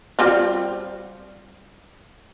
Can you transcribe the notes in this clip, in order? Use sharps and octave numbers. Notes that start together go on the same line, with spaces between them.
G3 C4 F4